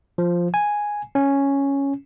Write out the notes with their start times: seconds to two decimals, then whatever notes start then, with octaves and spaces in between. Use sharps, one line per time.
0.18 F3
0.54 G#5
1.15 C#4